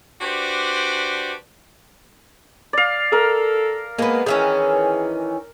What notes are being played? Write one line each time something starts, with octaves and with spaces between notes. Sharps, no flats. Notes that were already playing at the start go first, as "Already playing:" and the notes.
D4 F#4 G4 B4 C5 D5
D5 F5
A4 A#4
G#3 A#3 B3
D#3 E3 C#4 G#4